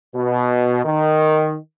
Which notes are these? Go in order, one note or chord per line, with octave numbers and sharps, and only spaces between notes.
B2
D#3